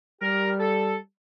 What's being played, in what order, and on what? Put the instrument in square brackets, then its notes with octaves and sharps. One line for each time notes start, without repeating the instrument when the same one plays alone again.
[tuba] G3 [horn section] G4 A#4
[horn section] A4